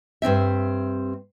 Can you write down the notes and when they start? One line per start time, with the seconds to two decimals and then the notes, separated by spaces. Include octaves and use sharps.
0.22 G2 C3 C4 E5